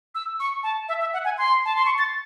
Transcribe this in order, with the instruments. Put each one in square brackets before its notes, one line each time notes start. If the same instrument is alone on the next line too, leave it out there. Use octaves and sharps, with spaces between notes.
[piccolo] E6
C#6
A5
E5
E5
F#5
G#5
C6
A5
C6
C#6
A6